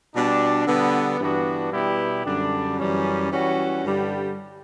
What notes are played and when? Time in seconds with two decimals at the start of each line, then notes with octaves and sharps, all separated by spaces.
0.14 B2 G3 D4
0.66 D3 G3 B3
1.20 G2 E3 B3 D4 F#4
1.72 B2 G3 B3 E4 G4
2.25 F#2 D3 G3 D4
2.79 F#2 E3 G3 C#4
3.31 E3 G3 C#4 F#4
3.84 G2 D3 G3